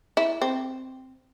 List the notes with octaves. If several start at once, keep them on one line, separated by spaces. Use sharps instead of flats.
E4
C4